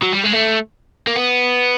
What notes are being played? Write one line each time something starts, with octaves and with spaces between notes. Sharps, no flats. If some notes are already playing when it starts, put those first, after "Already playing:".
F#3
G3
G#3
A3
A#3
B3